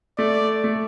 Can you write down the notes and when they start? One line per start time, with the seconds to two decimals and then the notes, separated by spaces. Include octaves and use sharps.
0.18 A3 D5
0.64 A3